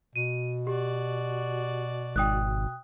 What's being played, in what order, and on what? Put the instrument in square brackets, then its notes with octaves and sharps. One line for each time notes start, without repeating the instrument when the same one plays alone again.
[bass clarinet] B2 [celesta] D#7
[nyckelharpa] F#4 D5 [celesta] G4
[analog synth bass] G#1 [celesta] G5 D#6 F#6